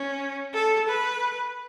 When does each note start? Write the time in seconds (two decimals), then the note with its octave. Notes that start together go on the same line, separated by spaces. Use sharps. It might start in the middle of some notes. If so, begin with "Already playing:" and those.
Already playing: C#4
0.54 A4
0.88 B4